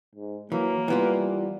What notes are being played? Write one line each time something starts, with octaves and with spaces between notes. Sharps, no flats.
G#2
E3 F#3 A#3
E3 G3 B3 F4